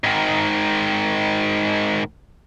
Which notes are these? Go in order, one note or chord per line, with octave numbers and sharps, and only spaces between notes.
G#2 D#3